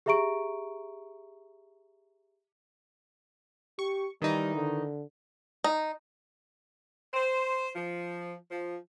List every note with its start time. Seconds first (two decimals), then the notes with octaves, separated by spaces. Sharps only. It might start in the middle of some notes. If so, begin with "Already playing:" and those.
0.06 G4 G#4 E5 A#5 C#6 D7
3.79 G4 C#6
4.22 D#3 E3 G3 D#4
4.55 D3
5.64 D#4
7.13 C5
7.76 F3
8.51 F3